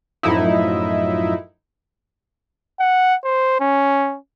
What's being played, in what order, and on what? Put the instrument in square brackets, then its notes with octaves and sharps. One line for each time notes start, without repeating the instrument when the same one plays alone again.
[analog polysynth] F#2 A2 F3 D#4 E4
[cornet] F#5
C5
C#4